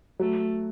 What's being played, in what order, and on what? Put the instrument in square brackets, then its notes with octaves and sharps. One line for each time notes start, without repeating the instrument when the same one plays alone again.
[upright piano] F#3 [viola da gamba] A3